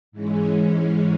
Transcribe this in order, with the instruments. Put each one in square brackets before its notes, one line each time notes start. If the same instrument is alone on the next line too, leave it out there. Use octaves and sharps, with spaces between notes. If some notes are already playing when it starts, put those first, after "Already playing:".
[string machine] G#2 E3 G#3 C#4